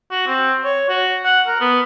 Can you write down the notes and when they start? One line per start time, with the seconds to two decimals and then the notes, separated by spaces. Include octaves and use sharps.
0.11 F#4
0.27 C4
0.64 C#5
0.89 F#4
1.25 F#5
1.47 A#4
1.60 B3